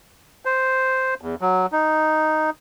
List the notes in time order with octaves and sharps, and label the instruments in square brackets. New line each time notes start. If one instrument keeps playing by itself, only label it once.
[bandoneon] C5
E2
F#3
D#4